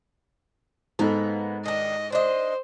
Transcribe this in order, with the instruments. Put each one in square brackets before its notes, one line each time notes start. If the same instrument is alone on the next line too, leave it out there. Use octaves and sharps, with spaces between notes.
[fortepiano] G#2 D#4 A4 [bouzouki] A#3 B3
[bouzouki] D#3 D4 [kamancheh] D#5
[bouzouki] D4 D#5 [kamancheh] C5